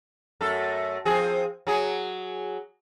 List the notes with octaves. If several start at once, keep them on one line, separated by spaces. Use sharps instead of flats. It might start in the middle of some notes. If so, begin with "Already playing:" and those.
F#2 A3 A4
F3 C4 G#4
F#3 G#4